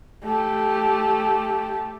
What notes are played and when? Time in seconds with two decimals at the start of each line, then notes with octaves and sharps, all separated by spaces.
0.24 A3 G4